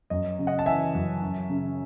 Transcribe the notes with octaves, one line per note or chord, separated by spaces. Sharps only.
F#2 D#5
C#3
D#5 F#5
A5
E3 E5 G#5
F#2
F#2
C#3